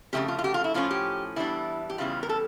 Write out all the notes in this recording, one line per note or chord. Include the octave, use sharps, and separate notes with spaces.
F2 C#3 F3 A3 C#4 G4
F4
F4
G4
F4
E4
A2 F3 C#4 F4
G4
E2 E3 G3 D4 E4
G4
E2 C#3 E3 G3 F4
A#4
A4